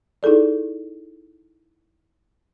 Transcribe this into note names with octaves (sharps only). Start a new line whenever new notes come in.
D#4 E4 G#4 A4 D5